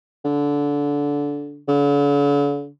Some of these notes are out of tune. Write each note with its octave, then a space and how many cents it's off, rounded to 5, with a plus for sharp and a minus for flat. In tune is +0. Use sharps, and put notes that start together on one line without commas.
D3 -20
D3 -45